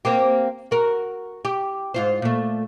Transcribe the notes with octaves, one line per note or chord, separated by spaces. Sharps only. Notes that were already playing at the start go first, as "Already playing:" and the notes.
A#3 C4 G4
F#4 A#4
G4
G#2 F4 C5
A#2 A3